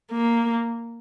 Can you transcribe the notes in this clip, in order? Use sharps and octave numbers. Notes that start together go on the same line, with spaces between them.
A#3